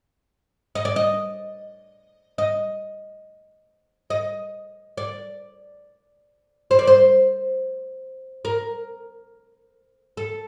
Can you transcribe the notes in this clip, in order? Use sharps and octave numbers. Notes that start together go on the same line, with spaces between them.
D#5
D5
D#5
D#5
D#5
D5
C5
D5
C5
A#4
A4